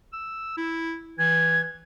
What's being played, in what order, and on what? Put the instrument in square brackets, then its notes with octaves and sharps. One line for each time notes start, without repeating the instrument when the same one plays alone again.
[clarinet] E6
E4
[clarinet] E3 [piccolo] G#6